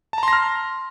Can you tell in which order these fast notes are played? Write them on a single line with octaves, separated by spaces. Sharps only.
A5 A#5 C6 A#6 F6